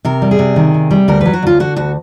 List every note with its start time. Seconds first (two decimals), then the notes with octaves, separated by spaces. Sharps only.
0.05 C3 A#4
0.22 G3
0.31 G#4
0.39 C3
0.56 D#3
0.74 C3
0.91 G3
1.08 D2 A#4
1.21 F#3 B4
1.33 F#4
1.43 D2 F4
1.60 D3 F#4
1.76 D2 F#4